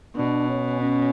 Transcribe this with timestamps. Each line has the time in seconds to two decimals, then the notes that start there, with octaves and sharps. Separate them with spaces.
0.16 B2 D4
0.47 C#4
0.79 C#4